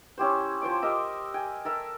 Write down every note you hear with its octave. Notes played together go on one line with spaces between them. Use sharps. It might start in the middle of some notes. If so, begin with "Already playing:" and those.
C#4 E4 G4 C5
F3 C5 D5 D6
G4 A#4 D#5 E5
G5 G#5
A4 A#4 E5